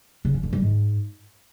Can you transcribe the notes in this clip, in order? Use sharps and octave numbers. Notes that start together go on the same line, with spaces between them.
C#3
F3
D3
G3
G#2